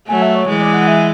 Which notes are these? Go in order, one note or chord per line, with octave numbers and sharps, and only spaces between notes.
F#3 A3 G#5
E5
C#5
E3 G#3
D5
F#5
E5